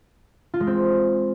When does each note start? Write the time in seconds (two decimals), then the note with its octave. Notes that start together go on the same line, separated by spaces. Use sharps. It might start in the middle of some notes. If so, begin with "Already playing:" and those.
0.54 F4
0.60 G#3
0.67 C4